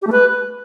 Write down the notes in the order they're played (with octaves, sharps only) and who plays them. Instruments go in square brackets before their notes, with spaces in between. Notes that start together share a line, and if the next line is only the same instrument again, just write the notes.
[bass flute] G4
A3
B4